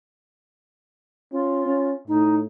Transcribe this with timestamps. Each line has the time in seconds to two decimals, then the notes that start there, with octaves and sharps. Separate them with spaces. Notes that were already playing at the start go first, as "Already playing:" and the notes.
1.32 C#4 F4
1.66 C#4
2.08 A2 D#4